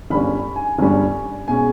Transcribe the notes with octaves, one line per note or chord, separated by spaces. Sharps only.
G1 G2 G3 C#4 B5
G#5
G1 G2 G3 C#4
B2 G#3 C#4 G#5